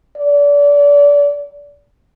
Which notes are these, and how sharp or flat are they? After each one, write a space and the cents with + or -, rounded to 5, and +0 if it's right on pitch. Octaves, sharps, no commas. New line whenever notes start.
D5 -30